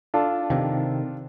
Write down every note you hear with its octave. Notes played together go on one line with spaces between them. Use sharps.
D4 F4 A4
C3 D#3